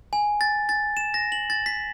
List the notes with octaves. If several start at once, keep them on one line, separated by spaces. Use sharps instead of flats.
G#5
A6
A6
E7
A#6
F#7
A6
B6